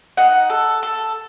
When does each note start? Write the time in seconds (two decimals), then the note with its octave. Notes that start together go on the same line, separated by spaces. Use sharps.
0.17 D#4 F#5
0.50 A4
0.83 A4